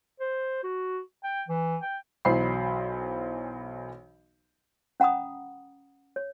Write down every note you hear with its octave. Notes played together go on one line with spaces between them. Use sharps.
C5
F#4
G5
E3
G5
B1 E3 F#3 C5 B5 C7
C#4 F#5 A#5 B5 D#6
C#5